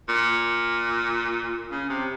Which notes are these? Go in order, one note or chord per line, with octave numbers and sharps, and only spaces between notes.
A#2
C#3
C3